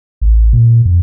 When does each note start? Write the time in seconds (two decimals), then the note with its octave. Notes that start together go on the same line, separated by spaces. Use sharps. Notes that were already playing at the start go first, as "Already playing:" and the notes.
0.21 A1
0.53 A#2
0.85 F2